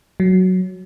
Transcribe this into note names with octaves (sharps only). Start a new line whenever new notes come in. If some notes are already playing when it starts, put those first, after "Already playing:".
F#3